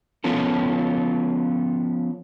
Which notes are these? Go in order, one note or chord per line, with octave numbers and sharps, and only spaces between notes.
F3 B3 C#4 F4 A4